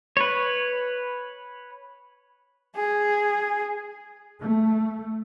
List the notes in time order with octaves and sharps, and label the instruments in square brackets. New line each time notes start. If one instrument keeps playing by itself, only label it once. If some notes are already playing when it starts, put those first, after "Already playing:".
[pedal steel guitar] B4 C#5
[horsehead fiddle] G#4
[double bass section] A3